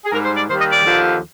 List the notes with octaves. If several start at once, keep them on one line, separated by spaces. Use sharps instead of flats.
G#4
G#2 G3 A#4
C5
D5
D#2 D#3 G3 C5
D#5
D5
D#2 D3 F3